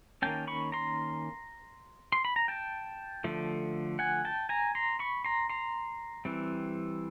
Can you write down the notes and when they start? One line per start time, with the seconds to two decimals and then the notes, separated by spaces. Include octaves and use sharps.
0.22 D#3 G3 A#3 C#4 G5 A5
0.47 B5 C#6
0.72 A#5 C6
2.12 C6
2.25 B5
2.36 A#5
2.48 G5 A5
3.24 D3 F3 A3
3.99 F#5 G#5
4.25 G5 A5
4.49 G#5 A#5
4.75 A#5 C6
4.99 B5 C#6
5.25 A#5 C6
5.50 A#5 C6
6.25 E3 G3 C4